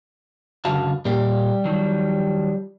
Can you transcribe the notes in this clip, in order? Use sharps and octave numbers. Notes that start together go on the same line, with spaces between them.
C#2 F#2 D3 F#4 F5 A5
A#2 G3 A#3 G4
D#3 F3 F#3